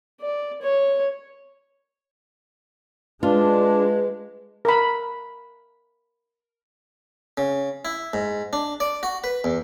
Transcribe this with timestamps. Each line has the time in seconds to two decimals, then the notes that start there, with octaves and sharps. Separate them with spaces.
0.21 D5
0.62 C#5
3.23 G#3 D4 F4 B4
4.65 A#4 B5
7.38 C#3
7.85 E4
8.13 G#2
8.53 D4
8.80 D5
9.03 F#4
9.24 B4
9.44 E2